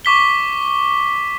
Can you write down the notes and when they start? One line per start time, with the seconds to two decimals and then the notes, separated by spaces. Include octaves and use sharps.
0.05 C#6 D6 B6 G7